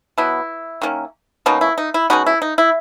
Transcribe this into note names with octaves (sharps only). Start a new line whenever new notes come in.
B2 F#3 B3 E4
D#3 A#3 C#4
B2 F#3 A#3 C#4 D#4
E4
D#4
E4
B2 G#3 C#4 D#4 F#4
E4
D#4
E4